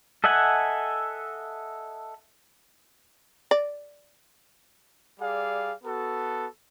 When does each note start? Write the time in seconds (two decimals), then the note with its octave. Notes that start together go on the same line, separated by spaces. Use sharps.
0.24 A4 D#5 E5 F#5 G#5
3.51 D5
5.20 G3 G#4 D5 F5
5.84 B3 F#4 A4